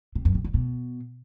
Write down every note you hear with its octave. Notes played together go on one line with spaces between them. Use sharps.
C3
F#2
C3
D3
B2